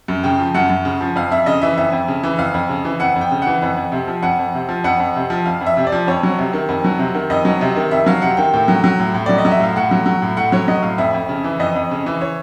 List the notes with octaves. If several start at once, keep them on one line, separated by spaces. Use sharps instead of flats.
F#2
C#3 G5
F3
F#2 F#5
F#2
C#3
F3
F2 F5
F2 E5
C#3 D#5
E3 E5
F2 E5
F2
C#3
E3
F2 F5
F2
C#3
E3
F2 F#5
F2
G5
C#3
E3 F#5
F2
F2
C3
F3
F2 F#5
F2
C3
F3
F2 F#5
F2
C3
F3
F2 F5
F2
E5
C3
D5
F3
F2 C#5
F#3
C3
D#3
F2
F#3
C3
D#3
F2 D#5
F#3
C3
D#3
F2 E5
F#3 F5
C3 F#5
D#3 G5
A2 G5
F#3
F#3
A2
A2
F#3 D5
D#5
F#3
E5
A2 F5
A2 F#5
F#3
F#3
A2
A2 F#5
F#3 C#5
F#3 D#5
A2 F5
F2 E5
F2
C#3
E3
F2 D#5
F2
C#3
E3
C#5